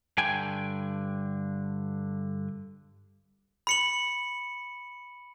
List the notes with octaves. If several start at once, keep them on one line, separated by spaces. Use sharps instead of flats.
G2 D3 G5 G#5
B5 C#7 F#7